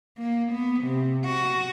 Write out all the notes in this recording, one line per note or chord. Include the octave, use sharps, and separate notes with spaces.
A#3
B3
C3
F#4